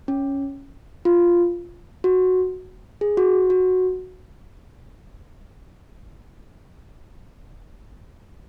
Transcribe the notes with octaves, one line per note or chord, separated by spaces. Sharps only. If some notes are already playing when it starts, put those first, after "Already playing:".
C#4
F4
F#4
G#4
F#4
F#4